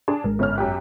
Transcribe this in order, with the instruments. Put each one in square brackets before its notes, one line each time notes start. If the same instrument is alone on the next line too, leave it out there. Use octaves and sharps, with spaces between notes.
[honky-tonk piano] D4 G#4
[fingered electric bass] G#1 G#3 [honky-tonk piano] A#4
[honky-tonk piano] G1 C#4 F6
F#2 G4 F#6